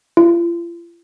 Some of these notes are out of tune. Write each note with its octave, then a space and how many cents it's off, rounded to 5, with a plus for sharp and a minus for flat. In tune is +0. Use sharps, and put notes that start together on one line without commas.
F4 -40